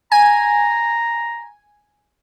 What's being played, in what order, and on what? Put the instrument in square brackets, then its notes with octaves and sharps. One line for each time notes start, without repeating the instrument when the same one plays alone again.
[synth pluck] G#5 [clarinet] A#5